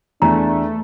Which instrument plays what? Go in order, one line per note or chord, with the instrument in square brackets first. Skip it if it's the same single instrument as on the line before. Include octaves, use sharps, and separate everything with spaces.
[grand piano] E2 [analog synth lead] A3 [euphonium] D4 [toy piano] A#5